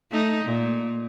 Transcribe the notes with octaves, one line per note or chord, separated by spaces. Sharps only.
A3 D#4
A#2